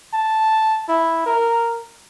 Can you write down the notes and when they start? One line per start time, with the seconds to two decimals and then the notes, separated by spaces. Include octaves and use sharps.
0.14 A5
0.89 E4
1.26 A#4